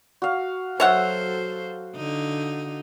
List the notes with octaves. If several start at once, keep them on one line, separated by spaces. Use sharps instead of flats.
F#4 F5
F#3 A4 C5 C#5 E5 F#5
D3 D#4